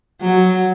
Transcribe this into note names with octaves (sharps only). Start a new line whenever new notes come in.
F#3